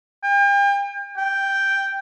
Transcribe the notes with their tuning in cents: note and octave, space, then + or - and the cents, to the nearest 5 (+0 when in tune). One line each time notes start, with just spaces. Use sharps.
G5 +40
G5 +0